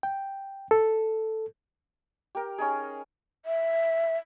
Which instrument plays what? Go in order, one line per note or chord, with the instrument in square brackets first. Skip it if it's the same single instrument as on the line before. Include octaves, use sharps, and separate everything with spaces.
[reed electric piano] G5
A4
[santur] G4 A#4
C#4 D#4 G#4
[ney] E5